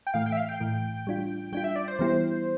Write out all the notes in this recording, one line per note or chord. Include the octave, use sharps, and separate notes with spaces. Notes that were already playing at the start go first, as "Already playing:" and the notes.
G5
A2 E3 A3 F5
G5
E5
F5
G5
A2 E3 A3
G3 D4 F4
G3 D4 F4 G5
E5
D5
C5
E3 G3 B3 E4 G4 C5